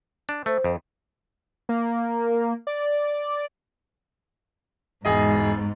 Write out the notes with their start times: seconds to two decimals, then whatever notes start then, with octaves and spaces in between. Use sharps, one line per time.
0.29 D4
0.46 A3 C5
0.64 F2
1.69 A#3
2.67 D5
5.05 E1 G#2 G#4 D#5